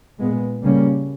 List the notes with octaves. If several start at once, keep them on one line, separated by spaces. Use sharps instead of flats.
A#2 G#3 B3
C#3 G3 A#3 C#4